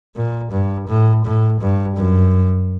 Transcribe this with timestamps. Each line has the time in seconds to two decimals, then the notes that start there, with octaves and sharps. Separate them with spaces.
0.16 A#2
0.51 G2
0.88 A2
1.24 A2
1.60 G2
1.97 F#2